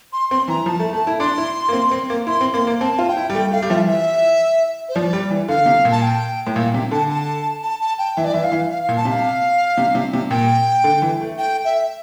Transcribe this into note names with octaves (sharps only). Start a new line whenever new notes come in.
C6
C4 C6
E3 A#5
F3 A5
A3
A3 A5
E4
D4 C6
E4
A#3
C4
C4
A#3
E4 C6
C4
A#3 C6
A#3
C4 A5
F4
G5
E4
G3
A3 G5
A3 F5
G3
F3 E5
E3 E5
C5
F3 D5
G3
E3
D3 F5
C3
A#2
A5
G5
A2
A#2 F5
C3 G5
D3 A5
A5
A5
A5
G5
E3 E5
D5
E3 E5
F5
E3
F5
F5
A#2
A5
C3 F5
C3
C3
C3
A#2 G5
D3
E3
A3
G5
E5